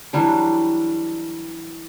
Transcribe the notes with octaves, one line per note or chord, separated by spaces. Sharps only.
E3 F#3 G3 D4